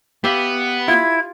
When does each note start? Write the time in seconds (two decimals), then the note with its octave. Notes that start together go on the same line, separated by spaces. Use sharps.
0.24 B3 G4 E5 F5
0.88 E4 F4 G#6